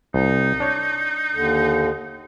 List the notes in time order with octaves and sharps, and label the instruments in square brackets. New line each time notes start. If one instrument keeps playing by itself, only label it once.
[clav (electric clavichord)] C2 [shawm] D#4
[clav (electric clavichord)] D4 C#5
[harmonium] D#2 D3